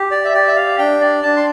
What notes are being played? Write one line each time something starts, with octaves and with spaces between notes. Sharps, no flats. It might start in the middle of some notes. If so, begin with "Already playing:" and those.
Already playing: G4
D5
E5
G4 D5
E5
F5
D4 G5
D5
D4 A5
C6